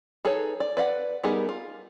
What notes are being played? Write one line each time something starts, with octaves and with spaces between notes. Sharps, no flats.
D#4 G#4 A4 B4 C#5
D5
B4 D5 F5 F#5
G3 B3 D#4 G#4 A#4
F4